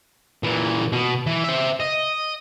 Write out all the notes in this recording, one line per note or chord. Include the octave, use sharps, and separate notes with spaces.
A#2 E3
B2
E3
C5 E5
D#5